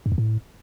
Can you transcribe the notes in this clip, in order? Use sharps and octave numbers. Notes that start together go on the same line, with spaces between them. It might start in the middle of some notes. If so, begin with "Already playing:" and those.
G2
E2
A2